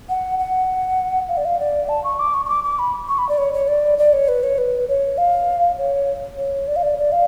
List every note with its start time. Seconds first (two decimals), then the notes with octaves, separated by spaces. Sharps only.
0.09 F#5
0.39 F#5
1.29 F5
1.37 D5
1.45 F5
1.60 D5
1.89 A5
2.04 C#6
2.19 D6
2.34 C#6
2.45 C#6
2.49 D6
2.64 D6
2.79 B5
3.08 C#6
3.18 B5
3.29 D5
3.38 C#5
3.54 C#5
3.68 D5
3.98 D5
4.13 C#5
4.28 B4
4.43 C#5
4.58 B4
4.89 C#5
5.18 F5
5.78 C#5
6.38 C#5
6.68 D5
6.76 F5
6.83 D5
6.98 D5
7.12 F5